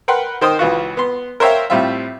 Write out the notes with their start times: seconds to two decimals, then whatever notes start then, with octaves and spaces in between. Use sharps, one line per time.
0.08 A#4 B4 F#5 G5 C6
0.41 D#3 C5 G5 D#6
0.59 C#2 E3 F4 F#4
0.97 B3 C6
1.40 A#4 C5 C#5 E5 F5 G5
1.70 A2 G3 C4 F4 E5